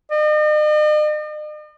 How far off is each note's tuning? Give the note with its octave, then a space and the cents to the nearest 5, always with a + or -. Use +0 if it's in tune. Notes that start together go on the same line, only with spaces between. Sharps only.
D#5 -45